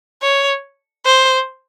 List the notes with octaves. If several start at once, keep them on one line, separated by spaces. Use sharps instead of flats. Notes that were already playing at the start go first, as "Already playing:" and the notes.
C#5
C5